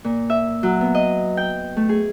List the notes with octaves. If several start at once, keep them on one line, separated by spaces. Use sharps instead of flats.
A#2
E5
F#3
B3
D#5
G5
A3
G#4